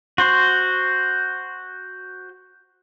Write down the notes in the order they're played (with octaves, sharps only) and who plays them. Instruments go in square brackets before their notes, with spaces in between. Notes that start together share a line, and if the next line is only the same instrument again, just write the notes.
[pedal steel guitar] F#4 C5